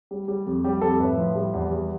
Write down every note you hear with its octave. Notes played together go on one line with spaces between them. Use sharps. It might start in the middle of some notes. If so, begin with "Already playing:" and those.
G3
G3
F2
G3 G4
F2 A4
A2 B4
F3
G3
E2
G3